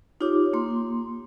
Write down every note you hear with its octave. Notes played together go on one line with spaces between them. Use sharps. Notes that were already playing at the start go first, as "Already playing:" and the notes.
D#4 F4 G4 C#5 D6
A#3 C6